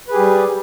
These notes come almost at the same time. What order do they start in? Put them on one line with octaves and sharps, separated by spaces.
B4 G#4 G4 G3